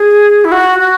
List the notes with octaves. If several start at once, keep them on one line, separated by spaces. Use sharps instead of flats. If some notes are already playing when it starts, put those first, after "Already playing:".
Already playing: G#4
E4
F#4
F#4